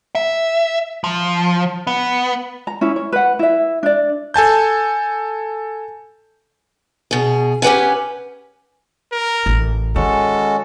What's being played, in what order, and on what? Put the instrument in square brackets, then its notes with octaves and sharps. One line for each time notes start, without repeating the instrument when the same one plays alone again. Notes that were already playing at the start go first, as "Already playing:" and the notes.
[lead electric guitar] E5
F3
B3
[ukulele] A#5
C#4 E4
C#5
B4 F#5
E4 E5
D4 D5
[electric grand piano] A4 G#5 A5 G6
[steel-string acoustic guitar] B2 G#4
C#4 G4 B4 F#5 G#5
[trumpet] A#4
[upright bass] A1
[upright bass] D#3 [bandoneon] G#3 C#4 F#4 [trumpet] A4